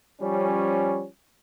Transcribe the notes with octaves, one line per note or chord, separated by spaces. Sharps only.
F3 G3 C#4